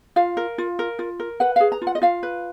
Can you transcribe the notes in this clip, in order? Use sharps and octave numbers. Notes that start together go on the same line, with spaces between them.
F4 F5
A#4
F4
A#4
F4
A#4
B4 F#5
G#4 F5
A#5
F4
F#5
D#5
F4 F5
B4